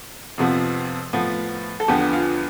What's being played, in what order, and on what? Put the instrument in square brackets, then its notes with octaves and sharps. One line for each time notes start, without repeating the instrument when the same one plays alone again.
[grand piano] F2 C3 F3 B3
A2 F3 B3
A4
E2 D3 F3 B3 G4
F4